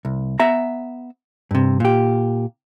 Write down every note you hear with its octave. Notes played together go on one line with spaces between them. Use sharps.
C2
B3 E5 A#5
G2 C3
A#2 G4